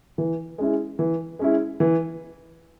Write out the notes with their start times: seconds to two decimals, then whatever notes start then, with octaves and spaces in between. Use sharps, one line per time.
0.18 E3
0.58 G#3 C#4 E4
0.99 E3
1.39 G#3 C#4 E4
1.80 E3